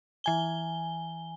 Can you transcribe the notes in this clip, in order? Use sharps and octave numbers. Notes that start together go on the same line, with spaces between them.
E3 G#5 G7